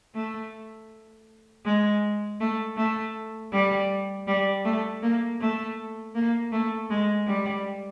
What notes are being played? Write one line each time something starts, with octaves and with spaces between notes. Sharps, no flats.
A3
G#3
A3
A3
G3
G3
A3
A#3
A3
A#3
A3
G#3
G3